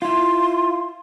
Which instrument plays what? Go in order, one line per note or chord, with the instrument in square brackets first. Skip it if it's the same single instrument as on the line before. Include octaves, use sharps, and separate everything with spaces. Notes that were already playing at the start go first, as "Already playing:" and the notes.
[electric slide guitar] E4 F4 [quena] C6